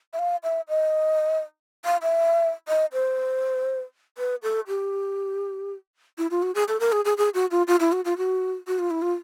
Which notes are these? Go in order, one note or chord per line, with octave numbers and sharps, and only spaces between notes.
E5
F5
E5
D#5
F5
E5
D#5
C5
B4
A4
G4
E4
F4
F#4
G#4
A4
A#4
G#4
G#4
G#4
F#4
F4
F4
E4
F#4
F4
F#4
F#4
F4
E4
F4